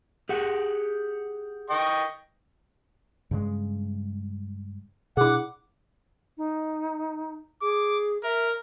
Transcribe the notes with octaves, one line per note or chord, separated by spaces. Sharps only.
G4 G#4 F#5
D#5 G5 C#6
G2 C#3 G#3
B2 D4 E4 G#4 F#5 D6
D#4
G#4 D6
A#4 E5